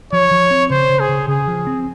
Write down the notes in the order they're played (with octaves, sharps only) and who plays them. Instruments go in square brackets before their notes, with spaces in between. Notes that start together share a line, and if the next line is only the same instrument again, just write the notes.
[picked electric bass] F3 [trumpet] C#5
[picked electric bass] F3
C4
[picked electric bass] C#3 [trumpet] C5
[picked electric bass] C#3
[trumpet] G#4
[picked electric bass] C#3
[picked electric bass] C#3 [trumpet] G#4
[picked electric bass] F3
C4